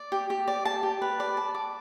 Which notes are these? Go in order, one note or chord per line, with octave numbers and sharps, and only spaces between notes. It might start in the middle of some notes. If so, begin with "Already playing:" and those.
Already playing: D5
G4
G4
D5
A5
G4
B4
D5
A5
D6